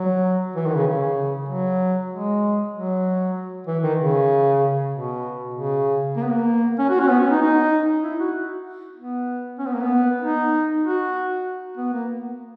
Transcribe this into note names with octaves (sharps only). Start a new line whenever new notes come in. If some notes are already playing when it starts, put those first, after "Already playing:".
Already playing: F#3
E3
D#3
C#3
C#3
F#3
G#3
F#3
E3
D#3
C#3
B2
C#3
A#3
B3
A#3
C#4
F#4
C#4
B3
C#4
D#4
D#4
E4
F#4
B3
C#4
B3
A#3
B3
D#4
F#4
B3
A#3